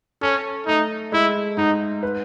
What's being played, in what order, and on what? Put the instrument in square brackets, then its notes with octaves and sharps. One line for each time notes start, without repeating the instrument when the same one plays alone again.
[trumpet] C#4 [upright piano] A4
[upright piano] A3 [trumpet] D#4
[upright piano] G#3 [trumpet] E4
[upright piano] G#2 [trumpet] D#4
[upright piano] B4